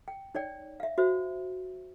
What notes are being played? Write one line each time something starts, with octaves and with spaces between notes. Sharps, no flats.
G5
D#4 C#5 D5 G5
E5 F5
F#4 C5 E5